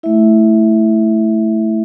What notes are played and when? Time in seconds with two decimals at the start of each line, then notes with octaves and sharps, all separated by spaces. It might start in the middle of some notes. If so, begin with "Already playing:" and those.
0.03 A3 E4 E5